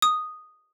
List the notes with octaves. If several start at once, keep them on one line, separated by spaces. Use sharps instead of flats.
D#6